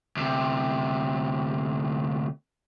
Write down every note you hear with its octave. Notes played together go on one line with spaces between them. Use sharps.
D2 C3